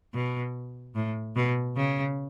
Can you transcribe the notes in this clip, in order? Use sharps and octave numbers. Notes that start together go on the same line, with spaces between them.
B2
A2
B2
C#3